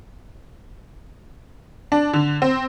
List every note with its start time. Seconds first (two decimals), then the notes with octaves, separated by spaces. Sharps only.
1.92 D4
2.13 D3
2.42 C4